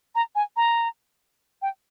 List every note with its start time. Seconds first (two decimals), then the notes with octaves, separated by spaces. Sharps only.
0.15 A#5
0.35 G#5
0.56 A#5
1.62 G5